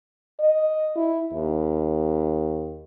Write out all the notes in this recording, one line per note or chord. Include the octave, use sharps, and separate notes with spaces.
D#5
E4
D#2